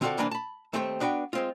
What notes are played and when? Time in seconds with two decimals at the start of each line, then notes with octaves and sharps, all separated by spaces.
0.01 D3 C4 F4 F#4 A4 D5
0.18 C2 E3 A#3 D4 B4 G#5
0.31 A5 B5
0.73 D#2 A3 C4 G4 C5 G5
1.00 B3 D4 F#4 B4 G5
1.33 G#3 C4 F4